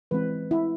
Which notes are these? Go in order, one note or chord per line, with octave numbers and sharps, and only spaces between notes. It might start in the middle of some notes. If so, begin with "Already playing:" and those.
E3 G#3 C4 B4
E4